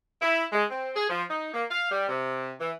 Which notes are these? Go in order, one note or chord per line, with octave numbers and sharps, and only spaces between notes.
E4
G#3
C4
G#4
F3
D#4
A#3
F5
G3
C3
E3